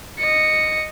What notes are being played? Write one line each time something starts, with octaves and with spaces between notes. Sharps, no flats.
D#5 C#7